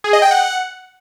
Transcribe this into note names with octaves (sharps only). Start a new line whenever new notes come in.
G#4
D#5
G5
F#5